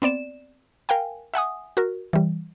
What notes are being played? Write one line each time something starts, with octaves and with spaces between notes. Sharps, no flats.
B3 C4 D5 E7
A#4 F5 G5 G#5
E5 F#5 G#5 D#6
F#4 A#4
E3 G3